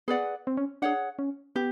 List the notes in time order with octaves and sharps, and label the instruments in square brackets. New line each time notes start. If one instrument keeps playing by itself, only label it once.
[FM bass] B3 [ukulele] G#4 B4 D5 F#5
[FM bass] C4
C#4
[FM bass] D4 [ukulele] G#4 C#5 F#5
[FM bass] C#4
[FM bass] B3 [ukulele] G4